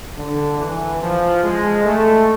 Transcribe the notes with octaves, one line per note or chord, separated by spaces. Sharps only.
D3
E3
F3
G#3
A3